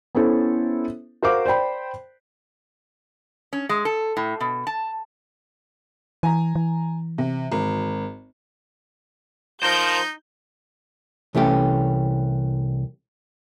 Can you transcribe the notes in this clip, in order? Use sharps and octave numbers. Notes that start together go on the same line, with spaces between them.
B3 C#4 E4 A4 C5
F#4 A#4 C5 F5 D6
C5 D5 G5 B5
C#4
G#3
A4
A2
B2
A5
E3 G#5 A#5
E3
C3
G#1
F3 D#4 A#4 C5 G6
C2 E3 A3 C#4 G4